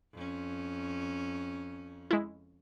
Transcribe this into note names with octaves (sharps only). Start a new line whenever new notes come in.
F2 C#4
G#3 E4